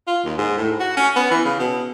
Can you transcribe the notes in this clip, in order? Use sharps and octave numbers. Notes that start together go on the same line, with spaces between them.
F4
D#2
G#2
A2
F#4
C#4
B3
E3
C#3
B2